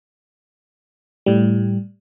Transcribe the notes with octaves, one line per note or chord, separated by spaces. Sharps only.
A2 G3